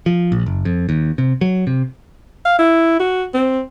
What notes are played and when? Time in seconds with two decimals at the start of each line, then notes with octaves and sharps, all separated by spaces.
0.06 F3
0.32 A#1
0.46 F#1
0.65 F2
0.89 D#2
1.18 C3
1.41 F#3
1.67 C3
2.45 F5
2.59 E4
3.00 F#4
3.34 C4